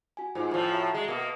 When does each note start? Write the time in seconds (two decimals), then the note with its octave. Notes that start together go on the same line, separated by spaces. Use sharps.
0.17 F#4 G#5
0.35 G#2 F4 C5 G#5
0.51 A2 F3 C#5 D5
0.73 F#4 E5 A#5
0.94 G#3
1.08 B2 A#3 D#6 C#7